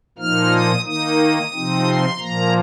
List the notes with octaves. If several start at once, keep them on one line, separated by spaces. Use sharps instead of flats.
A#2 F3 A#3 D#4 F6
D#6
D#3 A#3 D#4 D#6
C3 F3 C4 D#4
C6
A#2 F3 A#3 A#5